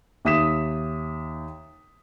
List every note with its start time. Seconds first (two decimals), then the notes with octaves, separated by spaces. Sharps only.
0.25 D#2 E5 D#6 B6 E7